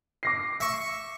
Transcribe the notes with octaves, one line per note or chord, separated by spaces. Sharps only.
D6 A#6 C7
E5 C#6